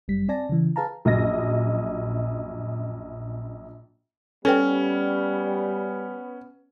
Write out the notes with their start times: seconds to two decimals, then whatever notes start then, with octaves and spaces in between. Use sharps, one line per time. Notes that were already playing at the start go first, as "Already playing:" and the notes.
0.08 G1 F#2 G3 B6
0.28 C4 D5 G#5 A5 A#6
0.49 C#3 E3
0.76 G#4 B4 F5 A5 A#5
1.05 A#1 F#2 D#5 A#6
4.45 G3 B3 C#4 A4 B4 G5